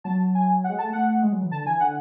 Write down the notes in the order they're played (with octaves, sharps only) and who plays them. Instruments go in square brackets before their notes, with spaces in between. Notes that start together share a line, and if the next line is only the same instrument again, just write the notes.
[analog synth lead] F#3 [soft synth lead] A5
[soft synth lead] G#5
F#5
[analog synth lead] G#3
[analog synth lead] A3 [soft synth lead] A5
[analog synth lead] A3 [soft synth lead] F#5
[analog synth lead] G#3
F#3
E3
[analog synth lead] D3 [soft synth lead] A5
[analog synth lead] E3 [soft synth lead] G#5
[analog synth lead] D3 [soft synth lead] F#5